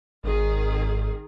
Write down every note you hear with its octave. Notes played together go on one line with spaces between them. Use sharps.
G#1 D#3 G#4